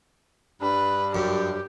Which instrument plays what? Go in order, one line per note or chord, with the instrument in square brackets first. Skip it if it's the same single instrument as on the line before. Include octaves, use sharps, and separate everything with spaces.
[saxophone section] G2 G3 D4 [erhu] B4
[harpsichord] F#2 [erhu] G4